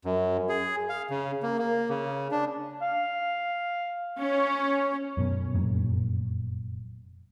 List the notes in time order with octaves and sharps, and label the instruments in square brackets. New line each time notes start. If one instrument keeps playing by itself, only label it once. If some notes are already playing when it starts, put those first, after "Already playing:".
[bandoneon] F#2
G#4
F5
C#3
A#3
A#3
C#3
D4
[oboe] F5
[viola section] C#4
[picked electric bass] F#2 B2
F1 F#2 A#2